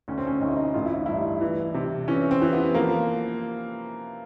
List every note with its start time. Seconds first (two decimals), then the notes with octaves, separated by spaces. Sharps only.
0.08 D2 C#4
0.18 C4
0.27 C#4
0.41 D2 D#4
0.48 E4
0.57 D#4
0.74 A1 F4
0.86 E4
0.96 D#4
1.06 G2 E4
1.41 E3
1.74 C3
2.08 E3 C#4
2.31 C4
2.42 E3
2.53 B3
2.74 F3 A#3